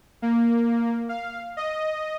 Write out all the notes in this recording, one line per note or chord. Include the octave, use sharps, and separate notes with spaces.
A#3
F5
D#5